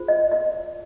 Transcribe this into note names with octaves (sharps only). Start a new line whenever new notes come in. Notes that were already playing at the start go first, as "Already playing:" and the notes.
Already playing: F4 G#4 C5
D#5
D#5